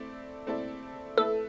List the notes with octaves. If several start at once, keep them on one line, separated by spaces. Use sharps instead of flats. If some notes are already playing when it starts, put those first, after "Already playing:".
Already playing: A3 C4 E4 D5
A3 C4 E4 A4 D5
A3 E4 A4 B4 E5